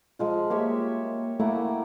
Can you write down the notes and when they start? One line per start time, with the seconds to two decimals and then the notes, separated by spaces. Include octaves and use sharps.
0.19 F3 G#3 F4
0.50 A#3 G4 C#5 E5
1.40 A3 A#3 E4 F#5